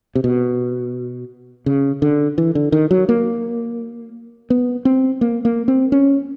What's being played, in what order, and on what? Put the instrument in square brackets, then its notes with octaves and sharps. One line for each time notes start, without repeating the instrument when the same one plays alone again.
[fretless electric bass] C3
B2
C#3
D3
E3
D3
D#3
F#3
A#3
B3
C4
A#3
A#3
C4
C#4